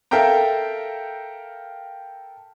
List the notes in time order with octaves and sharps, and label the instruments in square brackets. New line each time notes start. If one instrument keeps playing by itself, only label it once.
[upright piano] A4 A#4 E5 F5 G5 A#5